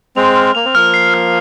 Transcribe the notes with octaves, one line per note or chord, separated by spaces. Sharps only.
G#3 C4 F7
F6
A#3 F7
C4
F3 A#3 F6
C7
F6